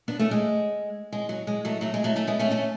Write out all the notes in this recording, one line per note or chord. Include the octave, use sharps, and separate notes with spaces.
B3 D4
A3 C#4
G#3
G#3
F#3
G#3
F#3 A3
F#3 A3
G#3
F#3 A3
A3 C#4
G#3 B3
A3 C#4
A3 C#4